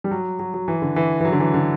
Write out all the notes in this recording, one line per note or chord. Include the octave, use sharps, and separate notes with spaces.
G3
F#3
F#3
F#3
E3
D3
E3
E3
F#3
D3
E3
D3